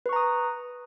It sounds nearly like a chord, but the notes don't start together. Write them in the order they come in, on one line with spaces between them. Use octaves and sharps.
B4 C#6 A#5 D#6